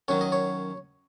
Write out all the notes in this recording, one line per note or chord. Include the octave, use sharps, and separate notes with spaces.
F#2 D#3 F#3 C#5
D#5
C#5